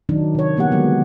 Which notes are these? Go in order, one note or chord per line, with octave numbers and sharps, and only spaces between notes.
D#3 F#3 D4 D#4
C3 C#5
F3 A#3 B3 G4 F#5
D3 F#3 G#3 B3